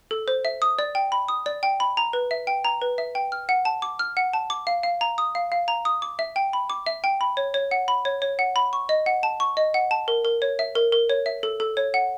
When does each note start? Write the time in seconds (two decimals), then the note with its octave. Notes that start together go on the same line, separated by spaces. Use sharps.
0.11 A4
0.28 C5
0.45 E5
0.62 D#6
0.79 D5
0.95 G5
1.12 B5
1.28 D#6
1.46 D5
1.63 G5
1.80 B5
1.97 A#5
2.13 B4
2.31 E5
2.47 G5
2.65 A#5
2.82 B4
2.98 E5
3.15 G5
3.32 F6
3.49 F#5
3.65 A5
3.82 D6
3.99 F6
4.17 F#5
4.33 A5
4.50 D6
4.67 F5
4.83 F5
5.01 A#5
5.18 D#6
5.35 F5
5.52 F5
5.68 A#5
5.85 D#6
6.02 D6
6.19 E5
6.36 G5
6.53 B5
6.70 D6
6.86 E5
7.04 G5
7.21 B5
7.37 C#5
7.54 C#5
7.71 F#5
7.88 B5
8.05 C#5
8.22 C#5
8.39 F#5
8.56 B5
8.73 C#6
8.89 D#5
9.06 F#5
9.23 A5
9.40 C#6
9.57 D#5
9.74 F#5
9.91 A5
10.08 A#4
10.25 A#4
10.42 C#5
10.59 E5
10.75 A#4
10.92 A#4
11.10 C#5
11.26 E5
11.43 A4
11.60 A4
11.77 C#5
11.94 F#5